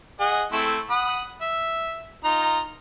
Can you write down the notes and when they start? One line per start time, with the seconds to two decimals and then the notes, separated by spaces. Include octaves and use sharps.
0.20 G#4 D#5 F#5
0.52 A3 C4 E4
0.90 F#5 B5 D#6
1.42 E5
2.24 D#4 F4 A#5